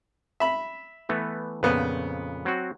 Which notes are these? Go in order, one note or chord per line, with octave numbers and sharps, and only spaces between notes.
E5 B5
E3 A3 B3
F2 A#2 C#3 B3 B4
F#3 C4 F#4